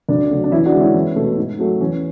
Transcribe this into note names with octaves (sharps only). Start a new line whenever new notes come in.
D2 D4
C#3 F#3 A3
D4
E2 C#4 E4
D4 F#4
D3 G#3
C#4 E4
E2
B2 A3
G#2
F#3 A3
E2 C#4